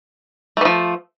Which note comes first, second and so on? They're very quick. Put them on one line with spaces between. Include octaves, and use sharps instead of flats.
A3 E3 F3